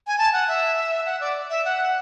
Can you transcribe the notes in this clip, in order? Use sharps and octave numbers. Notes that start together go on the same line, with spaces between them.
G#5
A5
F#5
E5
F#5
D5
E5
F#5